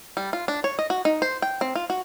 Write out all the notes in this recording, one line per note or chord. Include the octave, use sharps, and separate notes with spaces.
G3
F4
D4
C#5
D#5
F#4
D#4
C5
G5
C4
F4
F#4